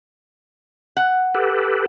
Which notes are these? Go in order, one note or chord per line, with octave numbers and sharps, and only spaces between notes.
F#5
G4 A4 B4